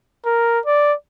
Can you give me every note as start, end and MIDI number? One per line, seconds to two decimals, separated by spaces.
0.25 0.59 70
0.66 0.93 74